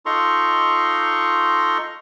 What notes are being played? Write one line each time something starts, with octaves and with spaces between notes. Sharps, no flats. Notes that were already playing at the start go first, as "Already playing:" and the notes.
D#4 F4 A4 A#5 C6 C#6